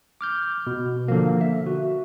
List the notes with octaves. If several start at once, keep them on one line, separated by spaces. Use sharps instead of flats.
D6 F6 G6
B2
D3 F3 A#3
E5
F#4